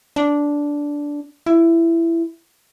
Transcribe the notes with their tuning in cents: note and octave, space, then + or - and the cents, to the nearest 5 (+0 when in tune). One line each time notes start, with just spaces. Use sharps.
D4 -10
E4 +15